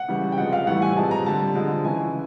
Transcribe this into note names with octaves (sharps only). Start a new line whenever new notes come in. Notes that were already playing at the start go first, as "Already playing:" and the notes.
Already playing: F#5
C#3 E3 G3
G5
C3 F3 G#3 F#5
F5
A2 E3 G3 F#5
G#5
C3 F3 G#3 A5
A#5
D3 G3 A5
D3 F3 G#3
C#3 E3 G#3 G#5